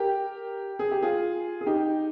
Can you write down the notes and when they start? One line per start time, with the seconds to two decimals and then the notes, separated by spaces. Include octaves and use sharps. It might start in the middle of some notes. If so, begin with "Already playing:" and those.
Already playing: G4 A#4
0.79 G#4
0.91 G4
1.02 F4 G#4
1.61 G#4
1.66 D#4 G4